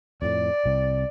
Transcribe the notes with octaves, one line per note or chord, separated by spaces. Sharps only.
F2 A2 D5
C2 C3